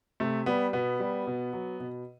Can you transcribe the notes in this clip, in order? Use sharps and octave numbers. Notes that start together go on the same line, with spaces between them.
C3 A3
G3 B3
B2 B3
G3
B2
F#3
B2